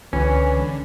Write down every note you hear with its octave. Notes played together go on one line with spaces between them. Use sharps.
C#2 D3 E3 C#4